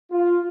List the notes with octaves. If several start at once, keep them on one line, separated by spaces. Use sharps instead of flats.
F4